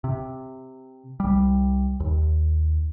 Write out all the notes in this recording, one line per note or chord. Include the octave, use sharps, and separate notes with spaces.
C3
C2 G3
D#2